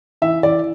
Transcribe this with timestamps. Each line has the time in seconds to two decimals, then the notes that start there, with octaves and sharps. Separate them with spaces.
0.22 E3 E5
0.43 E3 D5